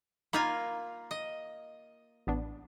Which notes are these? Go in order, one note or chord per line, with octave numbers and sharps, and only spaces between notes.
A#3 D#4 F4 G#5 A#5 B5
D#5
A1 B3 D4